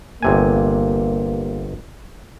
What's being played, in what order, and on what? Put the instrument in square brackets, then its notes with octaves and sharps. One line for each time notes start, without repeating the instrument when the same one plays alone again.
[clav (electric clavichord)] G1 C3 G#5 [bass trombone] A#3